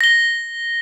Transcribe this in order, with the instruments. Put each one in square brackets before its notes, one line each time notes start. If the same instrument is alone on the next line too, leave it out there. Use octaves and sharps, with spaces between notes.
[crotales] A#6 G7